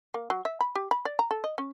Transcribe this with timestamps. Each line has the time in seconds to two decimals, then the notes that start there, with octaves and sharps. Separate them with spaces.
0.14 A#3
0.30 F#3
0.45 E5
0.61 B5
0.75 G4
0.91 B5
1.05 D5
1.19 A#5
1.31 A4
1.44 D#5
1.58 C#4